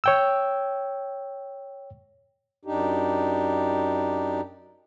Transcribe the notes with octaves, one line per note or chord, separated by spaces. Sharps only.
C#5 G5 E6
F#2 D4 D#4 G4